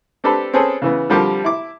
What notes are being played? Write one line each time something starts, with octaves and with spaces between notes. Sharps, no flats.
C4 D4 G4 A4 B4 B5
C4 C#4 G#4 A4 B4
C#3 E3 B3
D3 F3 G3 C4 G4 A#4
E4 D6